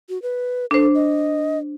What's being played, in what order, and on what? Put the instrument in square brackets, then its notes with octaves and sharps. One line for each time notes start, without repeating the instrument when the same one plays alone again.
[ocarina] F#4
B4
[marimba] D4 C5 [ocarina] A4
[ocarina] D#5